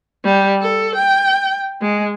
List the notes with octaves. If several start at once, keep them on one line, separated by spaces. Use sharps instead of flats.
G3
A4
G5
G#3